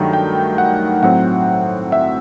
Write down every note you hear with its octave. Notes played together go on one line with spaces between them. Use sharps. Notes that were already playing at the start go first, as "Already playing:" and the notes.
Already playing: G2 D#3 F#3 A3 D#4 G5
G5
F#5
A2 F#3 C4 F#5
E5